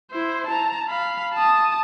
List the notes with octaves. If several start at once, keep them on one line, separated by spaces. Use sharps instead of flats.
E4 C5
A5 A#5
F5 B5
A5 D#6